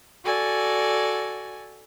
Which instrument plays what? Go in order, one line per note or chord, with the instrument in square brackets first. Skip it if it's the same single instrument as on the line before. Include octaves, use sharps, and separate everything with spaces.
[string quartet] F#4 A4 D5 G#5